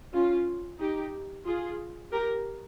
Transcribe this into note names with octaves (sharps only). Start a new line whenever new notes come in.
C#4 F4
D#4 G4
F4 G#4
G4 A#4